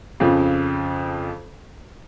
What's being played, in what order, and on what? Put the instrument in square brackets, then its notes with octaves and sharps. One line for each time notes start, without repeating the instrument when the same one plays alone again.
[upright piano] F2 C#3 F3